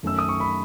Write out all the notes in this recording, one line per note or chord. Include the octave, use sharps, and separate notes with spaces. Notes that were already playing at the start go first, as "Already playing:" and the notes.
F#2 D#3 A3 C#4 E6
D#6
C#6
B5